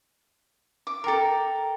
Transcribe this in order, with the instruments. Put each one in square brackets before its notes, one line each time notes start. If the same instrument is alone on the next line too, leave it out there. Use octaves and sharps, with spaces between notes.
[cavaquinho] D6
[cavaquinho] A4 A#4 [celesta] G5 A#5